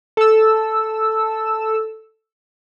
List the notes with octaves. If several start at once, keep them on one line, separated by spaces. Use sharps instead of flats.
A4 E6